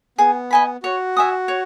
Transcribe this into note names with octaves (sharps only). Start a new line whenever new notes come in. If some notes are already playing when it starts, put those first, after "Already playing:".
B3 G#4
D#5 G#5 B5
F#4 C#5
E5 G#5 D#6
C#5